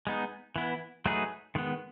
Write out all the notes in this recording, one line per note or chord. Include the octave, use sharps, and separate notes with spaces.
G#3 B3 D#4
E3 B3 E4
F#3 A3 D#4 G#4 B4
D#3 G#3 B3